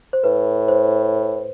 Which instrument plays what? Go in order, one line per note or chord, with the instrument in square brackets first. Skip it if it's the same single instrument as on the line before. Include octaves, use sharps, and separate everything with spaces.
[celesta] C5
[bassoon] A2 [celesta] B4
[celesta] C5